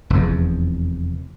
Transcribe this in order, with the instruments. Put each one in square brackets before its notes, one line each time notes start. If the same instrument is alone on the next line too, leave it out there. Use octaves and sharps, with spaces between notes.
[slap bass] F1 E2